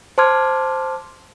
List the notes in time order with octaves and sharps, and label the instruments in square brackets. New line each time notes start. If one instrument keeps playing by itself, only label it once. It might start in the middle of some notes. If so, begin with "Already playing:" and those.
[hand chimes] C5 A5 C6 D6 F6 G#6